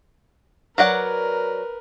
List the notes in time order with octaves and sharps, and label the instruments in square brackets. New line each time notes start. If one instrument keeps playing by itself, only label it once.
[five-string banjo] F#3 D5 F#5 [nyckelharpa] A#4 B4